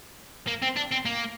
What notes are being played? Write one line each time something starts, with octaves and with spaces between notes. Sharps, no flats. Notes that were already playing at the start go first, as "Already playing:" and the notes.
A#3
C4
D4
C4
A#3